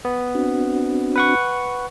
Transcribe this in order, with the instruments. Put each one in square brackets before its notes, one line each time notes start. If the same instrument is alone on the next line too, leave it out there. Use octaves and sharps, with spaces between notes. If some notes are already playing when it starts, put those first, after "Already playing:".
[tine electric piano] B3
[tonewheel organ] C4 D4 F#4
[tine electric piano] B4 F#5 C#6